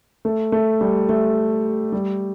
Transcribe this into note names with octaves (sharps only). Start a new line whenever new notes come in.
A3
A3
G3
A3
G3